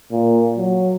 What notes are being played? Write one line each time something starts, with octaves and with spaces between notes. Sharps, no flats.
A#2
F#3